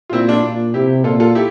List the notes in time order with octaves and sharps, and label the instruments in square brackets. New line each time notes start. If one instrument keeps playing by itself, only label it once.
[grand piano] F4
[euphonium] A#2 [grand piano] C4 E4
[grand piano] D4 F4
[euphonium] A#2
[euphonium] C3 [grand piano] E4 G4
[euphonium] A#2 [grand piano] F4 A4
[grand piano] F4 A4
E4 G4